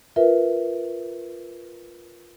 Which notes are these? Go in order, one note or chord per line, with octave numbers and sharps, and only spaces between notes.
F4 A#4 B4 E5